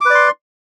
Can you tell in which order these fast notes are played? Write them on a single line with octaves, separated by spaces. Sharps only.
D6 B4 D5 C6